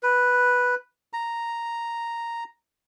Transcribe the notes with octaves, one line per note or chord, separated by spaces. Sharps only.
B4
A#5